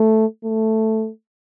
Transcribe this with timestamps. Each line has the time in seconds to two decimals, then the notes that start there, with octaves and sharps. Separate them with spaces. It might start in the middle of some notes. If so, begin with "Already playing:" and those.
Already playing: A3
0.44 A3